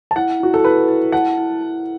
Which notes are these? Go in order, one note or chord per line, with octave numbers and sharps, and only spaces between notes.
A5
E4 F#5
E4 F#4
A4
E4 B4
E4
F#5 A5
E4
E4